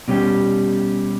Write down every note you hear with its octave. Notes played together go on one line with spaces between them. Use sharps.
B2 G3 C#4 G4